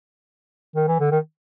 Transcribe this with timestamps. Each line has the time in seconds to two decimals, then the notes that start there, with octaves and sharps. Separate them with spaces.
0.75 D#3
0.88 E3
1.00 D3
1.11 D#3